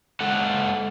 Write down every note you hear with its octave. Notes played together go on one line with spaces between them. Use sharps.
G#3 A4 F#5